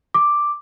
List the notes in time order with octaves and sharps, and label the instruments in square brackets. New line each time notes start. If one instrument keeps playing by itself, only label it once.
[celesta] D6